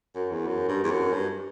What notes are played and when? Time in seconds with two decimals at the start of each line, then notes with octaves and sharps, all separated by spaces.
0.15 F#2
0.31 E2
0.47 F#2
0.68 G2
0.84 E2
0.91 F#2
1.13 G2